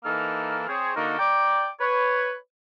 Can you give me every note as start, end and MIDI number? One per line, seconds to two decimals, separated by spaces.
0.05 0.64 52
0.05 0.64 58
0.05 0.64 63
0.05 0.64 69
0.05 0.64 89
0.68 0.92 60
0.68 0.92 68
0.68 0.92 73
0.96 1.17 50
0.96 1.17 58
0.96 1.17 63
0.96 1.17 66
0.96 1.17 69
0.96 1.17 70
1.19 1.68 74
1.19 1.68 79
1.19 1.68 82
1.19 1.68 86
1.80 2.34 71
1.80 2.34 73